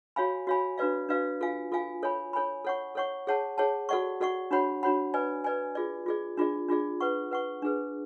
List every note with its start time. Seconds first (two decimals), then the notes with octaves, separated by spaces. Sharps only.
0.16 F#4 C#5 F5 G#5 B5
0.47 F#4 C#5 F5 G#5 B5
0.78 D4 F#4 B4 D5 F5
1.09 D4 F#4 B4 D5 F5
1.41 F4 A4 F5 G#5
1.72 F4 A4 F5 G#5
2.03 A4 C#5 G#5 B5
2.33 A4 C#5 G#5 B5
2.65 A4 C#5 F#5 C#6
2.95 A4 C#5 F#5 C#6
3.27 G#4 C#5 F#5 A5
3.58 G#4 C#5 F#5 A5
3.89 F#4 A4 D5 F#5 C#6
4.20 F#4 A4 D5 F#5 C#6
4.51 D4 F#4 C#5 F#5 B5
4.83 D4 F#4 C#5 F#5 B5
5.14 B4 D5 G#5
5.44 B4 D5 G#5
5.75 F4 G#4 D5
6.06 F4 G#4 D5
6.37 D4 F4 G#4 D5
6.68 D4 F4 G#4 D5
7.00 B4 F#5 C#6
7.31 B4 F#5 C#6
7.62 D4 G#4 B4